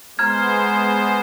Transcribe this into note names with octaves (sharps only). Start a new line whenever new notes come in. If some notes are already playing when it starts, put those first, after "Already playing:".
G#3 B3 C5 A#5 F6 G#6